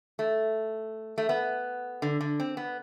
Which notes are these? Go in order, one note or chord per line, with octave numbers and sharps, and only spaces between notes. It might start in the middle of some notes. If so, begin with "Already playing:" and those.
A3
A3
B3
D3
D3
C4
B3